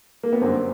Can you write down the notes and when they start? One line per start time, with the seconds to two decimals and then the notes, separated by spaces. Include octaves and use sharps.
0.23 A#3
0.33 B3
0.41 F#2 D3 G3 A#3 C4